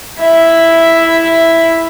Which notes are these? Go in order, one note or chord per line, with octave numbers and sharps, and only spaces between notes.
E4 E5